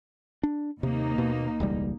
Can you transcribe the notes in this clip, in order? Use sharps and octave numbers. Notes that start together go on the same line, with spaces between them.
D4
D#2 C3 A#3 D#4
B2
E1 C#2 G3